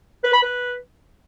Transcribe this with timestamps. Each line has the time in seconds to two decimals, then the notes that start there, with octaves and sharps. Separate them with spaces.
0.24 B4
0.33 B5
0.43 B4